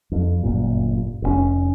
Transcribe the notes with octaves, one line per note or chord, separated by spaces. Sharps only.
F2
G1 F#2 A#2
F1 A#2 C#4